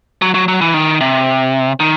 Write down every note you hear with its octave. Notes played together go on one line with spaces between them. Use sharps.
F#3
F#3
F#3
E3
D#3
C3
D#3